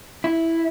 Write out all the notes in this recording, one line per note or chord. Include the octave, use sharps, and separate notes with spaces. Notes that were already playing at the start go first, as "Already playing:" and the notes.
E4